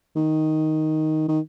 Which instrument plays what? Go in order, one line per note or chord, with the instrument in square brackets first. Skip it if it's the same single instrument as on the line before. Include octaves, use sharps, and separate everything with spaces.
[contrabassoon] D#3
D#3